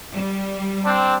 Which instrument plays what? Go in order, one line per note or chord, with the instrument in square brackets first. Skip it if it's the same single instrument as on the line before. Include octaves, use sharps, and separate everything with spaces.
[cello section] G3
[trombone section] C4 D4